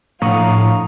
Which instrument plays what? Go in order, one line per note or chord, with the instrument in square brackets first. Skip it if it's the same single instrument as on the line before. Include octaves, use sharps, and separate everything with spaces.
[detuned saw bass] A2 [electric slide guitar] F3 D4 F#5 [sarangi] F5 [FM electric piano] A#5 C#6 D#6